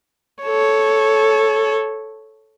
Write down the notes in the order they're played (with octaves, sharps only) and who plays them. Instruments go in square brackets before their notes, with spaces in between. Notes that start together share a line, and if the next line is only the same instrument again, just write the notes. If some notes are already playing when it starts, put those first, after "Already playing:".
[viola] A4 C#5